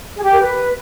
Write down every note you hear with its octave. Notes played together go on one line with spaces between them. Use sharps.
G#4
G4
A#4
B4